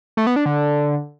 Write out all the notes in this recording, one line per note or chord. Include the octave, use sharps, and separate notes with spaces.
A3
B3
D4
D3